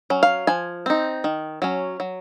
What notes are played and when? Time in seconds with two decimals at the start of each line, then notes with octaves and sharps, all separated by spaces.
0.10 F#3 C#4
0.23 F5
0.47 F3 G#5
0.86 C4 D#4
1.24 D#3
1.62 F#3 C#4
2.00 F#3